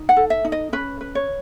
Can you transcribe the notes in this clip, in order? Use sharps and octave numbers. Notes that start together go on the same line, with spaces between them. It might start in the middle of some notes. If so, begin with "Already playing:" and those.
Already playing: D#4
F#5
A4
E5
D#4
D#5
C#4 B4
B4
C#5